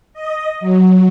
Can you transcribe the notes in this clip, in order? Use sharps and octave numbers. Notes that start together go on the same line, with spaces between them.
D#5
F#3